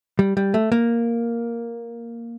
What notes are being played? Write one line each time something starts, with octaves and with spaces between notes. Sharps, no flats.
G3
G3
A3
A#3